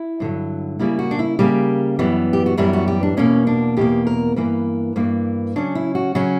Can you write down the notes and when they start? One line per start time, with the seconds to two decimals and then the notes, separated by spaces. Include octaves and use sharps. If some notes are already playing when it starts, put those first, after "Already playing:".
Already playing: E4
0.20 G2 D3 F#3
0.79 C#3 G3 A#3 E4
0.99 F#4
1.11 D4
1.19 E4
1.39 C#3 G3 A#3 G4
1.99 F#2 E3 G3 B3
2.33 G4
2.46 F#4
2.57 F#2 E3 G3 B3 E4
2.73 F#4
2.88 G4
3.03 D4
3.17 E2 B2 A#3 C#4
3.47 D4
3.77 E2 B2 A#3 G4
4.07 A#4
4.36 G2 E3 A#3 B4
4.96 G2 E3 A#3
5.56 C#3 F#3 C#4 D4
5.75 E4
5.95 F#4
6.15 C#3 F#3 C#4 F#4